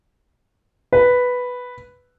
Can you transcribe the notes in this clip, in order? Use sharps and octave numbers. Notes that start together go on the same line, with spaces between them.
B4